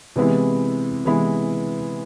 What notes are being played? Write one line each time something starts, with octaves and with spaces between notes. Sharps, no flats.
C3 E3 G#3 B3 E4
C3 E3 G#3 B3 E4